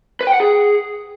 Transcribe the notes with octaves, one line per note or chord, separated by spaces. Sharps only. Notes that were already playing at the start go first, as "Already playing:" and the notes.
B4
G5
F#5
G#4